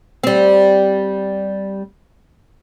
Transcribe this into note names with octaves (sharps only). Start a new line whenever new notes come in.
G3 C4